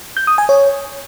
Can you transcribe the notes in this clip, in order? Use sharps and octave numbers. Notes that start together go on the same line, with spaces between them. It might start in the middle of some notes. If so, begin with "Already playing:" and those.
G6
D#6
G#5
C#5